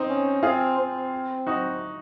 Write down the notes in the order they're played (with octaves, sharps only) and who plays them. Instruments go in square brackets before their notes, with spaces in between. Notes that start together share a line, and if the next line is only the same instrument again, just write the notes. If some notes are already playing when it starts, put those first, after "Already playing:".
Already playing: [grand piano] C4 D#4
[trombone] C#4
[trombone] C4 [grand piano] F4 G#4
[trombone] C4
[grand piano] D#4 F#4